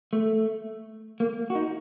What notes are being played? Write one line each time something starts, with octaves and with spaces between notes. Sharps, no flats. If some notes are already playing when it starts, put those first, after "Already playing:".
A3
A#3
F#4
D#4